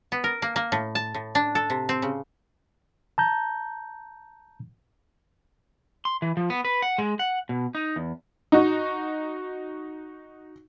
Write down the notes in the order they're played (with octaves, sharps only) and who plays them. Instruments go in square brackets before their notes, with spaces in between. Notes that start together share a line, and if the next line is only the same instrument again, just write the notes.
[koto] B3
A#4
A#3
A#3
A2
A5
A2
D4
A4
C3
C4
C#3
[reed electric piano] A5 A#5 G6
[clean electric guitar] C6
E3
F3
B3
B4
F#5
G#3
F#5
B2
D#4
E2
[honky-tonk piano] D#4 F#4